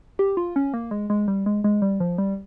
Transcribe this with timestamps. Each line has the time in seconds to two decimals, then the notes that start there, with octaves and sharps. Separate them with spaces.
0.19 G4
0.37 F4
0.56 C#4
0.74 A#3
0.91 G#3
1.10 G#3
1.28 G3
1.46 G#3
1.64 G#3
1.82 G3
2.00 F3
2.18 G3